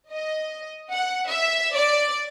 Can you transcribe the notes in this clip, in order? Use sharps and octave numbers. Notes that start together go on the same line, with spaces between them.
D#5
F#5
E5
D5